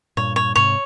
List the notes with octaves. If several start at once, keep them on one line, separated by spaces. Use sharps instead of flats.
G2 A#2 C#5
C#5
G#2 C3 C#5